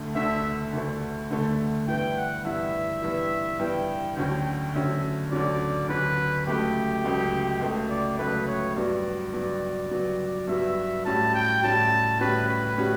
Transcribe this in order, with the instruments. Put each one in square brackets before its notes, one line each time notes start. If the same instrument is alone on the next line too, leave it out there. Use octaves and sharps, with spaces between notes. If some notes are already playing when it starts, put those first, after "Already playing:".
Already playing: [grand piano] D2 D3 A3
[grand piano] D2 D3 A3 [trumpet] E5
[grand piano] D2 D3 A3
D2 D3 A3
[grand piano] G2 E3 B3 E4 [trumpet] G5
[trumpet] F#5
[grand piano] G2 E3 B3 E4 [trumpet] E5
[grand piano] G2 E3 B3 E4
[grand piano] G2 E3 B3 E4 [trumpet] G5
[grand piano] D2 D3 F#3 C#4 F#4 [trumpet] G5
[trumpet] G5
[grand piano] D2 D3 F#3 C#4 F#4 [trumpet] E5
[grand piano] D2 D3 F#3 C#4 F#4 [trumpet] D5
[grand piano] D2 D3 F#3 C#4 F#4 [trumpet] B4
[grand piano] C#2 C#3 F#3 A3 [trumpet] G4
[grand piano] C#2 C#3 F#3 A3
C#2 C#3 F#3 A3
[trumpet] D5
[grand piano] C#2 C#3 F#3 A3 [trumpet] B4
[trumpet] C#5
[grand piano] G2 F#3 B3 F#4 [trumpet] D5
[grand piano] G2 F#3 B3 F#4
G2 F#3 B3 F#4
[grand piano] G2 F#3 B3 F#4 [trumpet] E5
[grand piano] A2 G3 C#4 F#4 [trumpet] A5
[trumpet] G5
[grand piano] A2 G3 C#4 F#4 [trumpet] A5
[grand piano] A2 G3 C#4 F#4 [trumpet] B4
[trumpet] B4
[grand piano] A2 G3 C#4 F#4